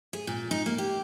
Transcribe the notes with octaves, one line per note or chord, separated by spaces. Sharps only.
G#4
A#2
D#4
A#3
G4